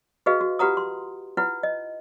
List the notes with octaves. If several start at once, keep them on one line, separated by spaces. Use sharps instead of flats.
F#4 G#4 B4 D#5 F5
F#4
F4 G4 B4 F#5 A#5 D#6
C6
E4 F4 B4 F#5
D#5